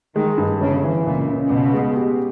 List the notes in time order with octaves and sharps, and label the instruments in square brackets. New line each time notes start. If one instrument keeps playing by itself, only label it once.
[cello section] D#3 [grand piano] G#3
[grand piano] G2
[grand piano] G1 [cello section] C#3
[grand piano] E3
[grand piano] C#2 [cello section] A#2
[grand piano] C#3
[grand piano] C#2 [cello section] B2
[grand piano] G#3
G4